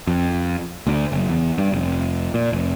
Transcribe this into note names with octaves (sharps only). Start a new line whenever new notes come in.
F2
D2
F#1
E2
G2
F1
A#2
F1